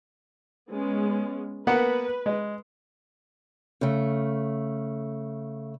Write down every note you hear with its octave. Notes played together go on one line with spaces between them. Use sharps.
G#3 B3 C#4
A#3 B3 B4 F#5
G#3
C#3 A3